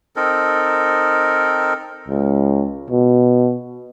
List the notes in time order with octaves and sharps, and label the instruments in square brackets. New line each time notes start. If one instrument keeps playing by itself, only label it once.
[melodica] C4 D#4 A4 A#4
[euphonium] C#2
B2